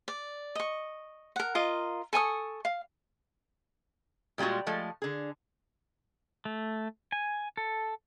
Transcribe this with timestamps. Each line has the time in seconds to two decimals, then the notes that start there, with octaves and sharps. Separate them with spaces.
0.08 D5
0.55 D#5 C#6
1.36 A#4 F#5
1.55 F4 A#4 D#5
2.13 A4 G#5 C#6 D#6
2.65 F5
4.38 A#2 G3 G#3 F4 F#4
4.67 F3 G#3 A3
5.02 D3 G#4
6.45 A3
7.12 G#5
7.57 A4